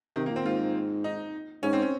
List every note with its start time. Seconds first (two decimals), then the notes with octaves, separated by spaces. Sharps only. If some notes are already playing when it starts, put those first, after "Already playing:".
0.16 C3 D#3
0.26 A#3
0.30 A#2
0.36 C4
0.45 G#2 F4
1.04 D#4
1.63 G#2 C#4
1.73 C4
1.82 C#4